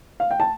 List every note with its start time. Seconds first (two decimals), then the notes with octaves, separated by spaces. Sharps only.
0.20 F5
0.31 G5
0.40 A5